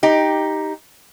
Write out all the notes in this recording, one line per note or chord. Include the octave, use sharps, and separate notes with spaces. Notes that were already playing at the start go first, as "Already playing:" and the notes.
D#4 G4